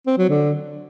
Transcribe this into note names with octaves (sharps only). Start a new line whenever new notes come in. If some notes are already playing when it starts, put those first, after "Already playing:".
C4
F#3
D3